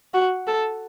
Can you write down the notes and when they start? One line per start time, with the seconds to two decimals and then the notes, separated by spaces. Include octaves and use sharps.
0.14 F#4
0.47 A4